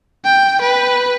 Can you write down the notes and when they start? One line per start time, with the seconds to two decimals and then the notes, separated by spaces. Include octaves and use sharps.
0.25 G5
0.61 B4